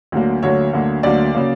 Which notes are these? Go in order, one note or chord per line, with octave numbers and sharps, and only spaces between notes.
D2 D3 F#3 A#3
D2 D3 F#3 A#3 C#5
D2 D3 F#3 A#3
D2 D3 F#3 A#3 D5
C#3 F#3 A#3